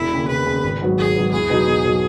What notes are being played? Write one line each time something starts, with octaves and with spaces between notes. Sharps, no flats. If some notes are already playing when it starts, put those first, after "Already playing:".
Already playing: E1 E4
D#2 C#3
E1 B4
D#2 C#3
G#1
G#2 F#3 B3
G#1 G#4
G#2 F#3 B3
E2 G#4
B2 F#3 B3 D#4
E2
B2 F#3 B3 D#4